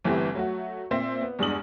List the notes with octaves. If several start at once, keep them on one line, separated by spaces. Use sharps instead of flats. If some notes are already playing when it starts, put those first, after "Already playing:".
G1 E3 A3 B3 C4 G4
F#3 A3 F#4
A#2 C4 C5 E5
B3
E2 G2 G#3 D4 D#6 F#7